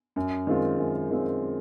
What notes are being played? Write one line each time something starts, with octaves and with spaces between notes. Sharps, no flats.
F#2
D#3 G#3 C4 F4
F#2
D#3 G#3 C4 F4